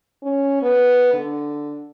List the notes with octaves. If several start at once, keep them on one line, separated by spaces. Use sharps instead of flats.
C#4
B3
D3